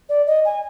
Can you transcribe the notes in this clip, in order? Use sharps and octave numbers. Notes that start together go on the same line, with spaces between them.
D5
D#5
G#5